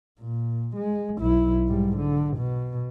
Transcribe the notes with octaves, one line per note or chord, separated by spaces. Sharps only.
A#2
G#3
B1 E4
G#2 G3
D3
B2